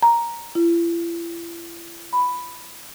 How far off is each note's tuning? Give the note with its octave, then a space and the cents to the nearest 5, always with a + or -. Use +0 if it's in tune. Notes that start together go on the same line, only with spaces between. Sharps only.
A#5 +5
E4 +45
B5 +5